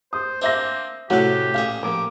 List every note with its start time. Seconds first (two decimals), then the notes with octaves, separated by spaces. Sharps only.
0.13 C5 D#6
0.42 A#3 C4 D4 C5 E5 A#6
1.10 A2 C3 A3 C#4 F#4 G4 A4 F#6
1.54 A1 A#2 G#4 F5
1.83 F3 A#3 G4 D6